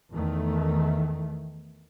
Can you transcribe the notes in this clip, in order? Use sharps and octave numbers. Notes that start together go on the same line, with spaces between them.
E2 D#3 A3